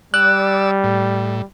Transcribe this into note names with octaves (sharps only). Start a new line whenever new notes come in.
G3 D5 E6 F#6
A2